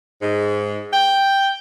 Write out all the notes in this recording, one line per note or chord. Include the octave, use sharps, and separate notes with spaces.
G#2
G5